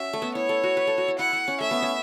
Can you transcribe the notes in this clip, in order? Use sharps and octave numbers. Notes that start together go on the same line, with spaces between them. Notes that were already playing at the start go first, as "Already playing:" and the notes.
Already playing: C#4 F#4 E5
A3
B3
E4 C#5
A4
F#4
B4
A4
F#4
E4
E4 F#5
E4
C#4
A3 E5
B3
C#4